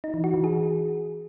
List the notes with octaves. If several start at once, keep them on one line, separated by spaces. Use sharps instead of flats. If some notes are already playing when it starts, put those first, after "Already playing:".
D#4
E3
F#4
E3
G#4